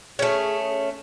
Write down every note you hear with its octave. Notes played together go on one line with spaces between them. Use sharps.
A3 C#4 G#4